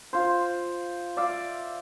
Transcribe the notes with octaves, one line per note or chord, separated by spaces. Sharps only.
F4 C5
D5 E5 F5